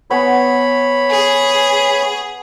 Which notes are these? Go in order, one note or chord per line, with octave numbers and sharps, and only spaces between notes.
B3 B4 C#5 G#5 B5
G#4